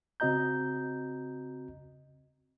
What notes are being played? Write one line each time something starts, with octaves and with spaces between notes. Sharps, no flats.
C#3 C4 F#4 D#5 A#5 G6